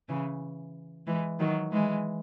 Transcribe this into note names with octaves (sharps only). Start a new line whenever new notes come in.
C#3 E3
E3 G#3
D#3 F#3
E3 G#3